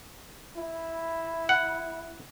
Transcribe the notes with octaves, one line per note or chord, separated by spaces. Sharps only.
E4
F#5